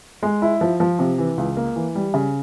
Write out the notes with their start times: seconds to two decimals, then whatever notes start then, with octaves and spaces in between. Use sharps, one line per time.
0.23 G#3
0.42 E4
0.61 F3
0.80 F3
0.99 C3
1.18 E3
1.38 C#2
1.57 A#3
1.76 E3
1.95 G3
2.14 C#3